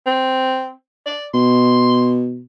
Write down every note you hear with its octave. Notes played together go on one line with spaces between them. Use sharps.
C4
D5
B2 C6